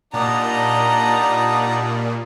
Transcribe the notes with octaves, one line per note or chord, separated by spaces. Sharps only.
A#2 G3 D4 D#4 F#5 A5 A#5 D#6